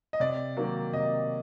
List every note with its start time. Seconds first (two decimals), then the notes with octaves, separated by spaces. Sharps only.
0.13 D#5
0.20 C3 D5
0.57 D#3 F#3 A#3
0.93 C3 D#5